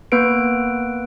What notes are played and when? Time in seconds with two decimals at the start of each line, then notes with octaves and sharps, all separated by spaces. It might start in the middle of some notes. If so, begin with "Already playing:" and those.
0.12 A#3 B3 B4 D7